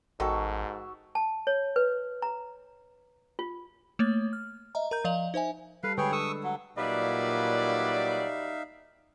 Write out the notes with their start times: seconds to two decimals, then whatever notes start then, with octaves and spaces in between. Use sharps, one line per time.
0.20 A1 G#2 D#3 D#4 F#4 A4 C#6 E6
1.15 A5
1.47 C#5
1.76 B4
2.22 A#5
3.39 F4
3.99 A3 A#3 C#5 A6
4.33 F6
4.75 D#5 E5 A#5
4.91 A#4 A#5 G6
5.04 F3 D5 D#5 F5 F7 F#7
5.34 D#4 C5 E5 G#5
5.83 G3 A4 B4 F5
5.98 D3 G#3 G#4 B4 C#5 G5
6.12 A4 C#6 D#6 E6
6.43 F#3
6.77 A#2 F#3 G3 D#4 B4 D5 E5 F5